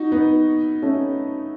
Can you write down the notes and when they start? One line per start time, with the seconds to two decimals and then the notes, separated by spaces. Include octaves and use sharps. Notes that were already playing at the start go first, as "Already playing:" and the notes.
Already playing: D#4 F#4
0.12 B3 D#4
0.82 A3 C#4